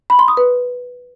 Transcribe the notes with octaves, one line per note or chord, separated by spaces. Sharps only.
B5
C6
D#6
B4